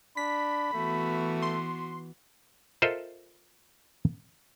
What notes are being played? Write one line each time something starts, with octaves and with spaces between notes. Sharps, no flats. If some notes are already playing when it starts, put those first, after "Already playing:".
D4 B5 B6
E3 A3 B3 F#4
C6
F4 A4 A#4 C5 D#5 E5